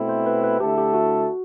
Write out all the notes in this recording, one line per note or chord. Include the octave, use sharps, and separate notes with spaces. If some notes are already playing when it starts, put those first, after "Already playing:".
Already playing: B2 A3 C4 E4
C5
B4
B4
D3 A3 E4 G4 A4
G4
F#4